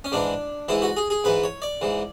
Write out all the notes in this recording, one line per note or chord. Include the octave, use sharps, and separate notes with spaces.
C#4
G#2 E3 D4
G#2 E3 E4
F#4
G#4
G#4
G#2 E3 B4
C#5
D5
G#2 E3